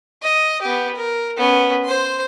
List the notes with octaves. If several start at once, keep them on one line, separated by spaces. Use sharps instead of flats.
D#5
B3 G4
A#4
B3 C#4
C5 C6